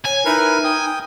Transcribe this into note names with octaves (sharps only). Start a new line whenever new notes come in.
C#5 G#5
D#4 E4 A#4 B4
G5 D#6